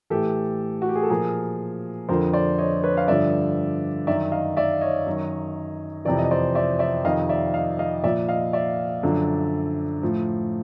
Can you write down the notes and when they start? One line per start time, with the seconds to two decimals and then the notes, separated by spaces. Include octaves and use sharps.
0.10 A2 E3 G4 A4
0.82 F#4
0.89 G4
0.96 G#4
1.03 A4
1.10 A#2 F3 G#4 A#4
2.09 F2 D3 F3 A#4 C5
2.33 C5 D5
2.58 C#5 D#5
2.83 B4 C#5
2.97 F5
3.08 G2 D3 F3 D5 E5
4.07 F#2 D#3 D5 E5
4.32 D#5 F5
4.57 D5 E5
4.81 C#5 D#5
5.06 F#2 D#3
6.05 F2 C3 E3 D5
6.19 D#5
6.31 C5 D5
6.55 D5 E5
6.79 D5 E5
7.05 F2 C3 D#3 D#5 F5
7.29 D5 E5
7.54 D#5 F5
7.79 D#5 F5
8.04 A#2 F3 D5 E5
8.29 D#5 F5
8.53 D5 E5
9.03 F#2 D3 F3
10.02 A2 F3